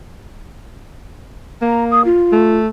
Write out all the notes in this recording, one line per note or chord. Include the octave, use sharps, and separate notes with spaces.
A#3 A#5
D#6
F4
A3